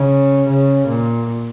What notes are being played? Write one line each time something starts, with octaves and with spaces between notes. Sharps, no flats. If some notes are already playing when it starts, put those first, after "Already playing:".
Already playing: C#3
C#3
A#2